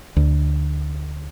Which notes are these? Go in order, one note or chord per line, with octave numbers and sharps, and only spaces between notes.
D2